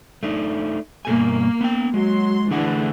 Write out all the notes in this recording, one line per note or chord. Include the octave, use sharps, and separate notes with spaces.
A3 D4 D#4
G2 B2 A#3 G#5
B3 G5
F#3 G#3 C6
D3 E3 A3 D4 G#4 F#5